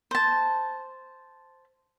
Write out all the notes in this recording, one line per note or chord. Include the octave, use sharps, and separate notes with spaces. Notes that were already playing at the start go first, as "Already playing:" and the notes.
C5 A5